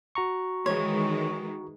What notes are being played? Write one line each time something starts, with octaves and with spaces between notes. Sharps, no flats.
F#4 A#5 C#6
D#3 E3 G#3 C#5